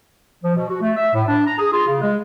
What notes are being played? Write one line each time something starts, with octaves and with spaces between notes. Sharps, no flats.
F3
B2
F#4
A3
E5
A2
D4
A#5
G#4
F4
C#3
G#3